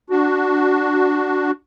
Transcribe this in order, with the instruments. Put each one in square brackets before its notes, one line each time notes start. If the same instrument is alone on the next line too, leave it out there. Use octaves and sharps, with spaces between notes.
[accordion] D4 F#4